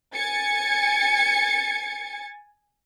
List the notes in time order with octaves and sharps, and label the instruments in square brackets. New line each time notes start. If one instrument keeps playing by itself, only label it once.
[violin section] G#5 G#6 A6 C#7